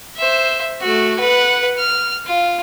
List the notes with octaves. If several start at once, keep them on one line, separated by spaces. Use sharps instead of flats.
C5 E5
A3 F#4
B4 F#5
F6
F4